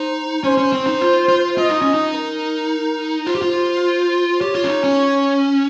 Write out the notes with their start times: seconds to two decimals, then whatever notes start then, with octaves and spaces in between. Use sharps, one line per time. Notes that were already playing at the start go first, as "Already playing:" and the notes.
Already playing: D#4 C5
0.44 C#4 C5
0.58 C#4
0.73 C4
0.86 D#4
1.01 F4
1.29 F4
1.57 F4 D#5
1.70 D#4
1.82 C#4
1.94 D#4
2.15 A#4
3.27 F4 C5
3.35 G4
3.42 F4
4.40 G4 C#5
4.55 F4
4.64 C#4
4.68 D#4
4.84 C#4